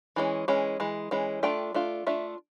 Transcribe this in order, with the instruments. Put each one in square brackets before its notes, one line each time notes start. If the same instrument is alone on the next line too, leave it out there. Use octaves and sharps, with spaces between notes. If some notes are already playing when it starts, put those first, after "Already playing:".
[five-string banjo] E3 G#3 C#4
E3 G#3 C#4
E3 G#3
E3 G#3 C#4
A3 D4 F4 G5
A3 D4 F4
A3 D4 F4 E5